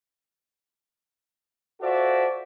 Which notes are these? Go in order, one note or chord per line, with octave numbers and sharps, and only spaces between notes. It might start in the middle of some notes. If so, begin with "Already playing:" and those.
F4 F#4 A4 C5 D5 E5